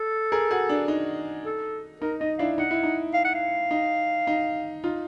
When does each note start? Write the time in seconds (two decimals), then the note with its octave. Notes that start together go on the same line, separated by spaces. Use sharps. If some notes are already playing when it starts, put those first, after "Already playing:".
Already playing: A4
0.32 G#4 A#4
0.51 F#4 G#4
0.69 D4
0.88 D#4
1.45 A4
2.02 D#4 A#4
2.20 D#4 D#5
2.39 D4 E4 F5
2.58 D#4 F#5
2.71 E4
2.83 D#4
3.14 F5
3.25 F#5
3.35 F5
3.71 D#4
4.27 D#4
4.84 D#4 F4